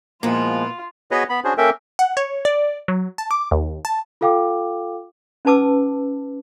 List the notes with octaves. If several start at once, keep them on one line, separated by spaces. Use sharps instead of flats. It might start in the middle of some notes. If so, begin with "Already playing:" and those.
A#2 F3 G#3 A#3 B3 E4 F4
B3 F#4 G#4 B4 C#5 D#5
B3 B5
C#4 D4 F#4 G#4 C5
A#3 C#4 A4 A#4 E5 G5
F#5
C#5
D5
F#3
A5
D6
D#2
A5
F4 A4 F5 G5 D6
C#4 D#4 B4 A5 D6 E6